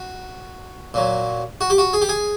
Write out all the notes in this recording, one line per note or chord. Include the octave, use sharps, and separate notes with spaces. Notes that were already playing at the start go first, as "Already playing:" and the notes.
Already playing: F#4
A#2 F#3
F#4
G4
F#4
G#4
G4
G#4